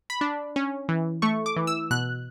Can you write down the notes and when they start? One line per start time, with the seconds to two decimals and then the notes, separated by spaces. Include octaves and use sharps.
0.10 B5
0.21 D4
0.56 C#4
0.89 E3
1.22 A3 C#6
1.46 D6
1.56 E3
1.67 E6
1.91 B2 F#6